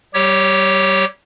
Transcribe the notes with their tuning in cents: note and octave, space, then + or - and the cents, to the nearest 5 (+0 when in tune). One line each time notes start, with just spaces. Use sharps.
G3 -30 G4 +0 C#5 +0